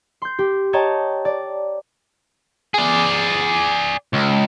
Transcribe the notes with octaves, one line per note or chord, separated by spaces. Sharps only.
C6 G6
G4
C#5 D#5 G5 A5 A#5
D5
G#4 D5
C#2